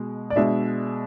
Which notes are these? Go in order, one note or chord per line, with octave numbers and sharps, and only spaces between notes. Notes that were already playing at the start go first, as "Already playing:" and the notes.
Already playing: B2 G#3
D5
B2 G#3 D4 E5